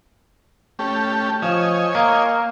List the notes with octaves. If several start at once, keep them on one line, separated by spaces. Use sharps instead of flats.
A3 C#4 G4
F3 C#5 D#5 G#5
A#3